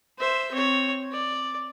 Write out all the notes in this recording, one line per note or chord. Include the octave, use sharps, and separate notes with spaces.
C5 E5
C4 C#5
D5